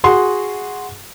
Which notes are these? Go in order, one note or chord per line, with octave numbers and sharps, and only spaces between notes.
F#4 G#4 F#5 C6